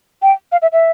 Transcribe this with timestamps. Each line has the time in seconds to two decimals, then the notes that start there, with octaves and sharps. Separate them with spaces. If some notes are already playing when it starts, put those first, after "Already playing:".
0.22 G5
0.52 F5
0.62 E5
0.72 E5